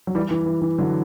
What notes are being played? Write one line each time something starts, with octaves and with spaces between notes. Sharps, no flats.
F#3
E3 G3
E3
E3
E3
D3 F#3